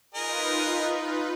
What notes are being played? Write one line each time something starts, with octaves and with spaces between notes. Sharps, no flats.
D#4 F4 G#4 A#4 B4 D#5